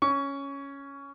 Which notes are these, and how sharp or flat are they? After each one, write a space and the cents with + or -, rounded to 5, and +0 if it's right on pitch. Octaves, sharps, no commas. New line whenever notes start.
C#4 +0 C#6 +20